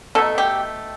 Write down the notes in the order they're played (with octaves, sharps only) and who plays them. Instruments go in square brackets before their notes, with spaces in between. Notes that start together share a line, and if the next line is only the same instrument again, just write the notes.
[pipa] B2 A3 D#4 A4
G4